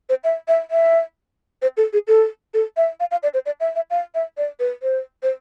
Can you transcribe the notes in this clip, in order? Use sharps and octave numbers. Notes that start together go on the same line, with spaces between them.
C5
E5
E5
E5
C5
A4
G#4
A4
A4
E5
F5
F5
D5
C5
D5
E5
E5
F5
E5
D5
B4
C5
C5